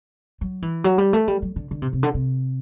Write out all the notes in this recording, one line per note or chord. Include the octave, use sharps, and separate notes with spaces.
F#3
E3
F#3
G3
A3
G3
F#3
D3
D3
C3
C3
D3
C3